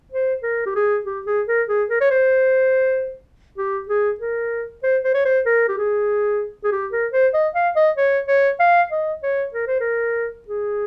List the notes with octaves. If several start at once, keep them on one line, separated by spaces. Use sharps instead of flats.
C5
A#4
G4
G#4
G4
G#4
A#4
G#4
A#4
C#5
C5
G4
G#4
A#4
C5
C5
C#5
C5
A#4
G4
G#4
G#4
G4
A#4
C5
D#5
F5
D#5
C#5
C#5
F5
D#5
C#5
A#4
C5
A#4
G#4